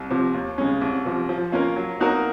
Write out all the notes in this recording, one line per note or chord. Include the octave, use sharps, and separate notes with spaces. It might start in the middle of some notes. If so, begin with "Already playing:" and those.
Already playing: C2
C3 F3
D#2
C#3 G#3 C#4
C2
C3 F3
F3
A#3 C#4 F4 A#4
F#3
A#3 D#4 F#4 A#4